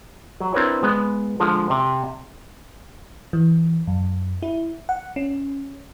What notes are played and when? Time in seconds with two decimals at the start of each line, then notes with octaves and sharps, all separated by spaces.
0.40 F#3
0.54 C4 D4 E4 A#4 B4 C#5
0.83 G#3 B3
1.40 D3 F3 G#3
1.70 C3
3.33 E3
3.87 F#2
4.43 E4
4.89 F#5
5.16 C#4